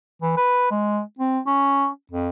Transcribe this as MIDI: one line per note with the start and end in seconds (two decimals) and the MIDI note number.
0.22 0.33 52
0.37 0.70 71
0.71 1.00 56
1.19 1.40 60
1.47 1.87 61
2.11 2.30 41